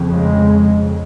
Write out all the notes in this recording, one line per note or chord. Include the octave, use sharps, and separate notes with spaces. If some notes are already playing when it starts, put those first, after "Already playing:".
Already playing: F2 C#3
G#3